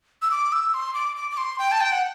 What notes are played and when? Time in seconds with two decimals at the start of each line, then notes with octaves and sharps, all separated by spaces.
0.22 E6
0.31 D6
0.52 E6
0.74 C6
0.94 D6
1.16 D6
1.31 D6
1.37 C6
1.59 G5
1.72 A5
1.81 G5
1.92 F#5